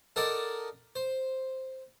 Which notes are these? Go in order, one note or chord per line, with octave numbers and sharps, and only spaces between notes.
D#4 A4 A#4 D5 D#5 F#5
C5